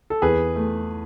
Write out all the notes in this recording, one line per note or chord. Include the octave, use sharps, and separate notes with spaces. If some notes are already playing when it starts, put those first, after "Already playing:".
A4
E2 G#4 B4
A3